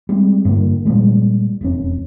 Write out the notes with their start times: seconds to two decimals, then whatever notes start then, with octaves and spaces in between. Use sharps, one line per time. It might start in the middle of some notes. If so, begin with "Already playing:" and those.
0.09 G3 G#3 C4
0.45 G2 D3 G3 A#3
0.85 A#2 F3 G3 G#3
1.61 E1 F2 C#4